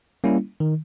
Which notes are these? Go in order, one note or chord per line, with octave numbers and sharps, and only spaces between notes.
G3 A#3 C#4 E4
D#3